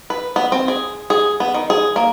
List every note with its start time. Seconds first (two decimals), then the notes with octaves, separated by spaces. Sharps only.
0.10 B4
0.36 B3
0.52 C4
0.68 G#4
1.10 G#4
1.40 B3
1.54 D#3
1.70 G#4
1.96 A#3